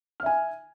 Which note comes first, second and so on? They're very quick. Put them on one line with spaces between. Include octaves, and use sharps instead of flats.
F6 E5 G#5